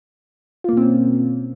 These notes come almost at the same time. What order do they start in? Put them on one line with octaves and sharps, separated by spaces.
F4 A#3 B2 C4 C#4